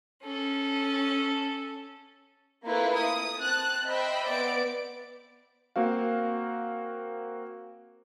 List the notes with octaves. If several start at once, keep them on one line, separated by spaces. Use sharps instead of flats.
C#4 A4
A3 A#3 C4 E4 F4 B4
D#6
C4 A5 F#6
C5 D#5 E5 G5 B5
B3 D5 D7
A#3 C4 F#4 F5